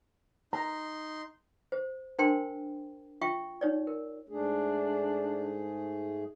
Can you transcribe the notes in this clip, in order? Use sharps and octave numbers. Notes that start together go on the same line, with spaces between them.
D#4 A#5 C6
C5
D4 A#4 C5 G5 A5 C6
F4 E5 G5 C#6
D#4 C#5 D5
A#4
G#2 A3 D4 G#4